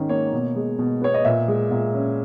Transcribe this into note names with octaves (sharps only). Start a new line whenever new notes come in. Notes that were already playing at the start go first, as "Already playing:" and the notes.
Already playing: G#2 D#3 C#4
A#3 C#5
B2
G#3
B2
B3 C#5
D#5
A#2 E5
G#3
A#2
C#4